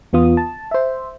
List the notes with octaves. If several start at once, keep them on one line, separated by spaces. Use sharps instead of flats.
E2 B3 F4 D#6
A5
C5 E5